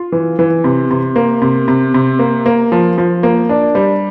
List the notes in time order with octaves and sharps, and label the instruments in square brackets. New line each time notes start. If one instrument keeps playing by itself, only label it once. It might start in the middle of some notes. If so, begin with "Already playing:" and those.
Already playing: [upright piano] F4
E3
E3
C3
C3
A#3
C3
C3
C3
A#3
A#3
F3
F3
A#3
D4
G3